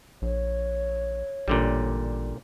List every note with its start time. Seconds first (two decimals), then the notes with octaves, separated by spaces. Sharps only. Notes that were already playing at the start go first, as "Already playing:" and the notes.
0.22 A#1 C#5
1.48 A1 A#2 D3 G3